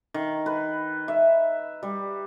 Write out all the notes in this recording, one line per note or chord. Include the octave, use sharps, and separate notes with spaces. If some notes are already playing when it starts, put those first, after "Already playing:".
D#3
B4
E5
G3